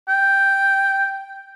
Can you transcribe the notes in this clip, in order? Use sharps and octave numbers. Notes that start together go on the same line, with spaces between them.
G5